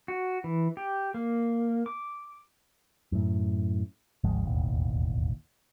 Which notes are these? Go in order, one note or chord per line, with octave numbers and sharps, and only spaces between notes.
F#4
E3
G4
A#3
D6
F#2 A2
G#1 D2 F3 G#3
E1 A1 D#2